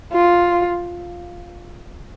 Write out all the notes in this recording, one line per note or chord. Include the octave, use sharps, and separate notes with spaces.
F4